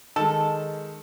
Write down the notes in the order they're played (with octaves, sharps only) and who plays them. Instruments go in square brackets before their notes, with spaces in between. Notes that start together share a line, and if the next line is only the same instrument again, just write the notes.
[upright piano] D#3 G#3 [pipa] A4